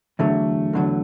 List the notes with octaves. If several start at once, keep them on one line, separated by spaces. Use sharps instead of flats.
E2 D3 F#3 A3
E2 D3 F#3